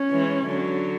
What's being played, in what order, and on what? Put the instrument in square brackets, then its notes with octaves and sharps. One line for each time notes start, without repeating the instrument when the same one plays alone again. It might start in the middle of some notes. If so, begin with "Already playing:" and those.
Already playing: [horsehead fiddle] C#4
[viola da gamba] E3 G#3
D3 F#3